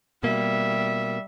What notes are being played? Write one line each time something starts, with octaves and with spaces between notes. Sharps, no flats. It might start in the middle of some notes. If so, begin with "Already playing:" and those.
B2 G3 A#3 E5